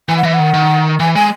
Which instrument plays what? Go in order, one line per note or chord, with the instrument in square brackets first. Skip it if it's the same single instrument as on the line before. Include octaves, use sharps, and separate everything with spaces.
[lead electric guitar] E3 [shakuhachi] G#5
[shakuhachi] F#5
[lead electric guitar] E3 [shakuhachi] E5
[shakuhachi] F#5
[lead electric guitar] D#3
D#3
[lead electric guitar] E3 [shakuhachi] G#5
[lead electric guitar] G#3 [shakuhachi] G#5